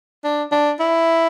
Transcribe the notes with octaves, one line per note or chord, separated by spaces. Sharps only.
D4
D4
E4